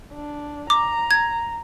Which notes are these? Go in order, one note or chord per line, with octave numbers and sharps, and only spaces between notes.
D4
A#5 D6
G#6